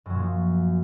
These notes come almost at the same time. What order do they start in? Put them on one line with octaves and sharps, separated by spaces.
F#2 F#3 A#2 F3